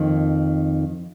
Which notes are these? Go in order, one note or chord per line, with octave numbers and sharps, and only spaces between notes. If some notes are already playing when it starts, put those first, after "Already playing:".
Already playing: F2 D#3 A#3